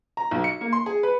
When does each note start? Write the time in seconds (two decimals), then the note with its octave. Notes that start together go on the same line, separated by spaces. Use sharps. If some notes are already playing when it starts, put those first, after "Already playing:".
0.17 A#5
0.31 B1
0.44 C#7
0.61 A#3
0.73 C6
0.86 G#4
1.03 B4